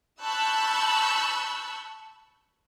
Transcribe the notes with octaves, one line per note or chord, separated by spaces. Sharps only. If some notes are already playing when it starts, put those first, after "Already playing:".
A5 B5 C#6 E6 F#6 G6